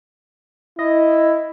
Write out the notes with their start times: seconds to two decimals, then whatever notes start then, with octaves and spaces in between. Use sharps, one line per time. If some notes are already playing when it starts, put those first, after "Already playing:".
0.79 E4 D#5